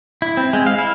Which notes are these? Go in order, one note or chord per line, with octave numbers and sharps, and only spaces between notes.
E4
C4
G#3
F5
E4